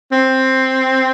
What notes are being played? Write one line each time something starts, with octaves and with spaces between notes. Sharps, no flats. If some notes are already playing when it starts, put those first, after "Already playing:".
C4